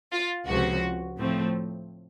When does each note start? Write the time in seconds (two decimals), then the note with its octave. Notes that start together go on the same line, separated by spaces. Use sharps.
0.12 F4
0.48 C#2 C3 F3 F#4
1.17 A2 F3 A3 C4